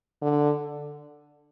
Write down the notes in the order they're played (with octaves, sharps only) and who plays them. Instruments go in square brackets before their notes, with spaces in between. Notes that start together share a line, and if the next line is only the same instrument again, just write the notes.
[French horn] D3